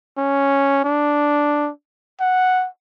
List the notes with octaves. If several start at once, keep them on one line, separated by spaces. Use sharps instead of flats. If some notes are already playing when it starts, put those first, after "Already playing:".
C#4
D4
F#5